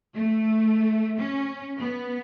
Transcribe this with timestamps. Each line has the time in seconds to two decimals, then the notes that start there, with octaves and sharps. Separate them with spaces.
0.15 A3
1.20 C#4
1.80 B3